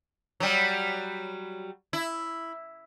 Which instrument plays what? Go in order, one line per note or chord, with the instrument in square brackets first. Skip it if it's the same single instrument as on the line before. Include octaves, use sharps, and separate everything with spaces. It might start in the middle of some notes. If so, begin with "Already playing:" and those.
[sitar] F#3 G3
E4